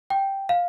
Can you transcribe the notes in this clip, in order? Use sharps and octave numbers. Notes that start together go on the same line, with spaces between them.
G5
F5